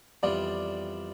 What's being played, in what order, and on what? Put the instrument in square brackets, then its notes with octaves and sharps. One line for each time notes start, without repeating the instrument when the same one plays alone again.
[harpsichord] F2 E3 G3 B3 F4 [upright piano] D5